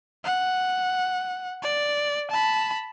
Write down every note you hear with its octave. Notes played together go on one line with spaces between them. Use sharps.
F#5
D5
A5 B5